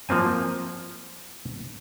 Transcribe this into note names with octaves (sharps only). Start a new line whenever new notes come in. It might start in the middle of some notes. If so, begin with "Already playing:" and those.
F3 A#3 C4 G#5